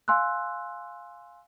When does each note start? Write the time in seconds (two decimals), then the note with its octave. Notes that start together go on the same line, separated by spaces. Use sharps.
0.08 F5 G#5 C6 E6 F#6